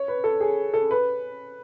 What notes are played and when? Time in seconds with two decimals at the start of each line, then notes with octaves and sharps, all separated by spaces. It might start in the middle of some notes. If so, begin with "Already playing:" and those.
Already playing: C#5
0.08 B4
0.24 A4
0.41 G#4
0.74 A4
0.91 B4